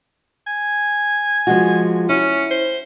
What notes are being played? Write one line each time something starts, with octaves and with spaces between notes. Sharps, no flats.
G#5
F3 G#3 F#4
C#4 E4
C5